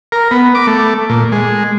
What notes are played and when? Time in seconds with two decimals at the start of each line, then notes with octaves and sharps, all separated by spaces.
0.12 A#4
0.31 B3
0.55 D6
0.67 A3
1.10 A#2
1.32 G#3